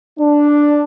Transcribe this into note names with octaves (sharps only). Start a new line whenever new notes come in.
D4